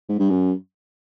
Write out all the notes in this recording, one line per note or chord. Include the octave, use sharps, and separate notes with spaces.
G#2
G2
F#2